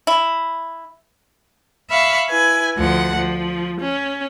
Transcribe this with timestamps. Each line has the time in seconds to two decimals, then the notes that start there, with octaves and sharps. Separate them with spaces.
0.07 E4
1.90 E5 F5 B5 C#6
2.29 E4 B4 G#5
2.77 D2 F3 F#5
3.15 F3
3.80 C#4